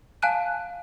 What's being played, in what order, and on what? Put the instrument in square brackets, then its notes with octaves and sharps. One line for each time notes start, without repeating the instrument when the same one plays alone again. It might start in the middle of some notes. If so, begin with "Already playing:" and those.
[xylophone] F5 G#5 A5 F#6 D#7